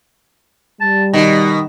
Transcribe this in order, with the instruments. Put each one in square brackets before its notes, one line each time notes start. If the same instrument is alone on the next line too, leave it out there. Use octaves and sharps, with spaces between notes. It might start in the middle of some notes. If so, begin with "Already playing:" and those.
[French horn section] G3 [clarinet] A5
[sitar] B2 [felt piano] D#3 [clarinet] D#5